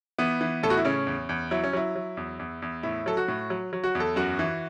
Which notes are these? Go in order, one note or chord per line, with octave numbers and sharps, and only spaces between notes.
E3 B3
E3
A2 A4
F#4
E4
C#3 C#4
E2
E2
F#3 E4
C#4
F#3 E4
F#3
E2
E2
E2
A2 E4
F#3 A4
F#4
A2
F#3
F#3
F#4
E2
A4
F#2 F#4
E3